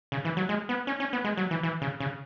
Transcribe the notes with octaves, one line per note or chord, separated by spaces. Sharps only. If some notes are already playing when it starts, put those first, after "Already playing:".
C#3
E3
F#3
G#3
B3
C#4
C#4
B3
G#3
F#3
E3
E3
C#3
C#3